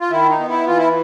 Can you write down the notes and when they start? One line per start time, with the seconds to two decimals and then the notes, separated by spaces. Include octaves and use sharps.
0.01 F4
0.10 D#3 E4
0.30 D#4
0.38 B3
0.49 E4
0.67 E3 F4
0.78 E4